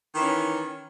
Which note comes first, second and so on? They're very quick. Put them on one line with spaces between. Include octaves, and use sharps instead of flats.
D#3 E3 C#4